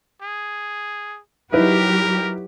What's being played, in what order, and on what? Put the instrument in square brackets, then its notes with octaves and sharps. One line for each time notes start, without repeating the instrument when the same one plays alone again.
[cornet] G#4
[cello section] F#3 G4 [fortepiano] D#4 E4 B4 [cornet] A#4